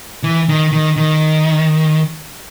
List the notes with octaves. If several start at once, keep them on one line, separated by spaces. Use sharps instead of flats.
E3
D#3
D#3
D#3